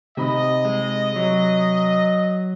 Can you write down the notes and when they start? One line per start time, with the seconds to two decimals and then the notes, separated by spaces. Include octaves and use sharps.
0.17 C3 D#4 D#5 B5
0.65 G#3
1.16 F#3